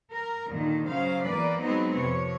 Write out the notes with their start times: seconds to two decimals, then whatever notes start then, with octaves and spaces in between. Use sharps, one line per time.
0.12 A#4
0.48 D#2 A#2 D3 D#3
0.88 C#3 F#3 C5 F5
1.24 E2 A#3 B4 D5
1.60 F#3 G#3 B3 C4 D#4
1.95 F2 C3 C#5